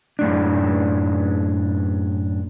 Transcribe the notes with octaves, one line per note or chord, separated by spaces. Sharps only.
F#2 A2 D4